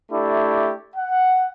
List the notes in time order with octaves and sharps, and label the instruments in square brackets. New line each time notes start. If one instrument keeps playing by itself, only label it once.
[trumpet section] A3 D4 E4 G4
F#5